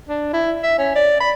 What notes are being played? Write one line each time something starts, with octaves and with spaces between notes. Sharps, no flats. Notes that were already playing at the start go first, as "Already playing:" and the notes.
D4
E4
E5
C#4
D5
B5